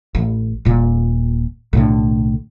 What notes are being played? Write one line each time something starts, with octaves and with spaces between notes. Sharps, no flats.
A1
D#1 A#2
B1 A2 D3